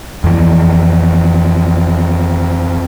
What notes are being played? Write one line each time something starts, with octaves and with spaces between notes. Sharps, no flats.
F2 E3